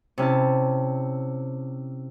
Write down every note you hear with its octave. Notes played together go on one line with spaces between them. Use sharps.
C3 C#4 E4 A5